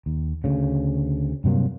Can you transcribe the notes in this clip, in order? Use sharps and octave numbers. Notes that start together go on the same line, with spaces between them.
D#2
D2 C#3
G2 C3 F#3 A#3